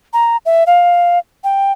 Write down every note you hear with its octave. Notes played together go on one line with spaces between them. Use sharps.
A#5
E5
F5
G5